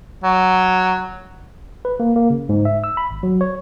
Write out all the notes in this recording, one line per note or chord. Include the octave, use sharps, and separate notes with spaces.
F#3
B4
A#3
A#3
C#3
G#2
E5
E6
B5
G#1
F#3
C#5